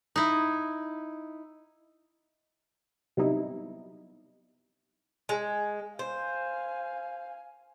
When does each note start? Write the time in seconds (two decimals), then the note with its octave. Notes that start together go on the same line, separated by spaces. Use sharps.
0.16 D#4 E4
3.17 C3 F#3 G3 B3 D#4 E4
5.29 G#3
5.99 C5 F5 G#5